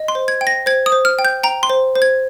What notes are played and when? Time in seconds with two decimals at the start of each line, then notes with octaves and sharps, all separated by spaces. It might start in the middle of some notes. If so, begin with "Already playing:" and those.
Already playing: D#5
0.08 C6
0.15 C5
0.28 G#6
0.41 G5
0.47 A#6
0.66 C5 G#6
0.86 D#6
0.92 C5
1.05 F6
1.19 G5
1.25 G6
1.43 G5 A#5
1.63 C6
1.70 C5
1.95 C5
2.02 G#6